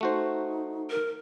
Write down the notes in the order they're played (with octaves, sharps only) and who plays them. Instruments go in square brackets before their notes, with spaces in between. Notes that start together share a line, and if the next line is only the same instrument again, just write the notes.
[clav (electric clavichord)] A3 F#4 C5 [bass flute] D#4
[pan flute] A#4